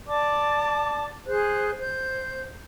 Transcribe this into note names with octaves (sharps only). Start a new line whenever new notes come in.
D5 A5 D6
G#4 C5 F#6
C5 G6